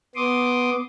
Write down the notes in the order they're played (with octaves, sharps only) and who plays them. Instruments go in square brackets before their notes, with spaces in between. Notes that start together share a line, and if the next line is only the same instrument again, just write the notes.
[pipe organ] B3 C6 D6 D#6